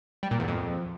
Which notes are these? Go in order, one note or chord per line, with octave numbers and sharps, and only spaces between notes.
G3
A#2
E2
F2